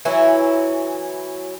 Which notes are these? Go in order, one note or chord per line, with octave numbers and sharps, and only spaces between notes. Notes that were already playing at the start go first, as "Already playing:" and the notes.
E3 F#3 C#4 E4